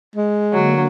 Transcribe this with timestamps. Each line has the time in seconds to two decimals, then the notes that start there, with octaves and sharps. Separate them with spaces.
0.16 G#3
0.53 D3 F#3 A#3